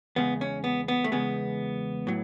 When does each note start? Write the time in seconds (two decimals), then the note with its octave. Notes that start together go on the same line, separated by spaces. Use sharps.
0.16 E2 C#3 G#3 B3
0.41 C#4
0.64 B3
0.88 B3
1.04 A3
1.12 E2 C#3 G#3 B3
2.07 A2 F#3